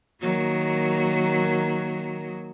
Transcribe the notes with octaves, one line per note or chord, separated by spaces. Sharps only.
D#3 F#3 A#3